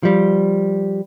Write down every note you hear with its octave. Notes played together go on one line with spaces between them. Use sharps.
F3 G3